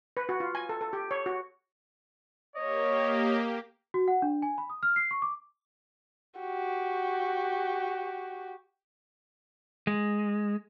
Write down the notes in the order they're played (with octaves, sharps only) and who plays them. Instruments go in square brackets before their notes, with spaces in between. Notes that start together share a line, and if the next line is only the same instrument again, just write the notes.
[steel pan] B4
F#4
F4
G#5
A4
A4
G4
C#5
F#4
[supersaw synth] A#3 G4 [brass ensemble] C#5 [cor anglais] D#5
[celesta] F#4
F#5
D4
G#5
B5
D#6
F6
C7
C#6
D6
[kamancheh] F#4 G4
[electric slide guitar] G#3